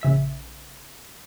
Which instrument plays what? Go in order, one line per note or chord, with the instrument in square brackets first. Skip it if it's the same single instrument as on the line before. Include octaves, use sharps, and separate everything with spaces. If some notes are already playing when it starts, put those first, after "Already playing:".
[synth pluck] A#1 C#3 E5 B6